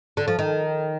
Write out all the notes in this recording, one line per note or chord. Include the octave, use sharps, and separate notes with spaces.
D3
F3
D#3